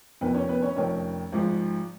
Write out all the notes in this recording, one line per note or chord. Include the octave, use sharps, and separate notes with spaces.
F1 F2 D#3 B3 B4
C#4 C#5
B3 B4
C#4 C#5
F1 F2 D#3 C#4 C#5
G#1 G#2 F3